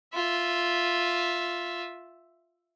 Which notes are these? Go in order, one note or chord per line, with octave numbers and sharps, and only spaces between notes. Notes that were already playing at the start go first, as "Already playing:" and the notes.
F4 E5